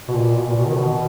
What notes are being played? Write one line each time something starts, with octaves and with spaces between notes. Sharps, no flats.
B2
A#2
B2
A#2
B2
D#3
B2